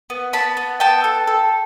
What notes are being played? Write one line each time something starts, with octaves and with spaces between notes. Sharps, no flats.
B3
B3 A5 B5
B3
B3 G5 A5
A4
A4